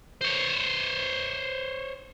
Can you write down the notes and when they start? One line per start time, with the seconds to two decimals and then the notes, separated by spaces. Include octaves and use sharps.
0.21 C5 C#5